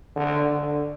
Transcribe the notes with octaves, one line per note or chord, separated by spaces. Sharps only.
D3
D3